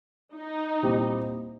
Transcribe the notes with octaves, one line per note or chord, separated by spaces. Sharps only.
D#4
A#2 G3 C4 E4 G4